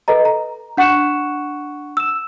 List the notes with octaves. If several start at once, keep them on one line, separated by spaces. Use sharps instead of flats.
A4 B4 D#5 A#5
A#5
D4 F#5 C#6 F#6 C#7 E7
E6 E7